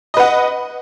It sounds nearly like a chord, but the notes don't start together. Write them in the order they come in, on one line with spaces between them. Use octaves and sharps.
D#5 B4 F#5